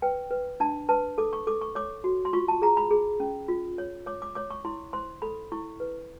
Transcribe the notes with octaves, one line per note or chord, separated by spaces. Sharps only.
B4 G5
B4
D4 A5
B4 A5
A4 D6
C#6
A4 D6
C#6
C#5 D6
F#4
C6
F4 C#6
A5
G#4 A#5
B5
G#4
C#4
F4
C#5
C#5 D6
D6
C#5 D6
C#6
E4 C6
C5 C6
A4 B5
E4 C#6
B4